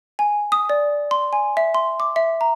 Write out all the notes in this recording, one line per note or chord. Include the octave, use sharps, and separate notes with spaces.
G#5
D#6
D5
C6
G#5
E5
C6
D6
E5
A#5